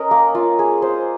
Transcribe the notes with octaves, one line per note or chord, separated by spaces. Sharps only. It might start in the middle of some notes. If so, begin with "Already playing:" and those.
Already playing: C#4 A#4 D#5
A#3
F4
G#4
C5